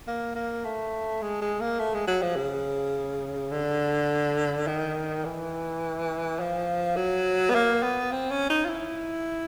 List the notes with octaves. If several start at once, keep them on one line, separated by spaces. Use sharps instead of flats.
A#3
A#3
A3
G#3
G#3
A#3
A3
G#3
F#3
F3
C#3
D3
D#3
E3
F3
F#3
B3
A#3
B3
C4
C#4
D#4
F4
E4